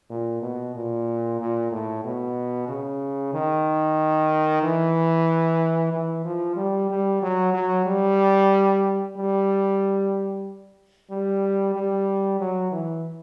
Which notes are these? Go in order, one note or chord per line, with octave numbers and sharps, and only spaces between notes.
A#2
B2
A#2
A#2
A2
B2
C#3
D#3
E3
E3
F3
G3
G3
F#3
F#3
G3
G3
G3
G3
F#3
E3